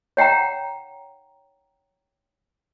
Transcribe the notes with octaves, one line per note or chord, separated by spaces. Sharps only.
C#5 F#5 G5 A#5